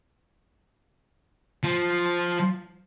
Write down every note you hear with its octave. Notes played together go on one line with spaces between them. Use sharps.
F3